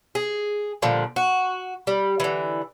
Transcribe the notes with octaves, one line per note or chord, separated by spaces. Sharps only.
G#4
A#2 D3 F3 G3
F#4
G3
D3 E3